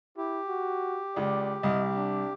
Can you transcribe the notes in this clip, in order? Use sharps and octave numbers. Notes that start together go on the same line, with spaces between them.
E4 G4
F#4
C#2 D5
C2 D#5
D4